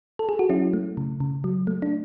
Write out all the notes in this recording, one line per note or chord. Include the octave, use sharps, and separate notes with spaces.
A4
G#4
F#4
F#3 C#4 E4
A3
C#3
C#3
F#3
A3
D4